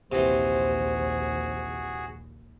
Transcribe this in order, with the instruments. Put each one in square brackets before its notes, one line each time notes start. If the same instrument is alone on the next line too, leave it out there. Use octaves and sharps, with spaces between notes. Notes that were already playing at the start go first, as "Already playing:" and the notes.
[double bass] A#1 D#2 [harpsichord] C3 E3 [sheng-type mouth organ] F#4 G#4 [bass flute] C5